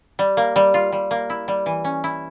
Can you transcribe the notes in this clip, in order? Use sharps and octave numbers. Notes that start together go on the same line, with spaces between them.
G3
A#3
G3
F4
G3
A#3
E4
G3
E3
C#4
E4